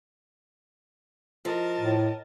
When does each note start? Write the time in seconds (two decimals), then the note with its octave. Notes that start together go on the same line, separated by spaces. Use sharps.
1.45 F3 A#4 D#5 A5
1.80 A2